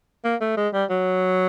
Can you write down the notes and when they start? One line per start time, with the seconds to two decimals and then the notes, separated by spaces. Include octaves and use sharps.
0.25 A#3
0.41 A3
0.57 G#3
0.73 G3
0.90 F#3